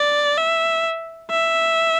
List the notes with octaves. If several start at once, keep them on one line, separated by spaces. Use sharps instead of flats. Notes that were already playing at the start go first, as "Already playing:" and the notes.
Already playing: D5
E5
E5